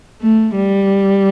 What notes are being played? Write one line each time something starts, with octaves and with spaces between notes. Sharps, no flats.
A3
G3